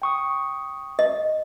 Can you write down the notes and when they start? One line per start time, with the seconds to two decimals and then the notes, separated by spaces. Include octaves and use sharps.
0.02 G5 C#6 D#6
0.99 D#5